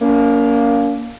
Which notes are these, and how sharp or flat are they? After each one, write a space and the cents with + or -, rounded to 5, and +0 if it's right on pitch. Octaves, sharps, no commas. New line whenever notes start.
A#3 +0 C#4 +40